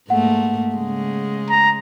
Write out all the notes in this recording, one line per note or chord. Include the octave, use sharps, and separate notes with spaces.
G#2 A3 A#3 F#5
C#3 G#3
A#5